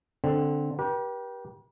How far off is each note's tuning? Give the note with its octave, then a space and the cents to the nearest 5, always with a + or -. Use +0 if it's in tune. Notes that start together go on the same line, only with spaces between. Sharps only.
D3 +0 C4 +0
G4 -10 B4 -45